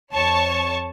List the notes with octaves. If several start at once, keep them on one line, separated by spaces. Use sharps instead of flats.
F2 C#5 A5 C#6